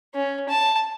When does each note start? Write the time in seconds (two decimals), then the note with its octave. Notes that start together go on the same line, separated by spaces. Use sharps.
0.15 C#4
0.49 A5